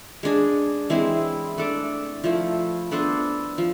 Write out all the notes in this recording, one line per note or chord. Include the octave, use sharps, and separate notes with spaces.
G#3 D4 G#4
E3 G#3 C4 E4
A3 D4 A4 D5
F3 A3 E4
B3 D4 A4 C5
F3